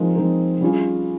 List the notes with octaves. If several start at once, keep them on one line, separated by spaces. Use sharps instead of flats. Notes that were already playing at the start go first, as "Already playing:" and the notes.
Already playing: F3 G#3 C4 D#4 A#4
F3 G#3 C4 D#4 A#4
G3 C#4 F4 G#4